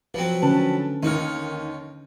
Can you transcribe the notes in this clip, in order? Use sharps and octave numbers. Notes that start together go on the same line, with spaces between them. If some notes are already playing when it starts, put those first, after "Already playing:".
F3 F#3 C4 B4
D3 C#4 B4 A5
D#2 D#3 D#4 C#5 F6